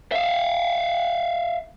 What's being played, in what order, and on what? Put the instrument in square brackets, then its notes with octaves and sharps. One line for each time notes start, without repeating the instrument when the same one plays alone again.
[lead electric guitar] E5 F5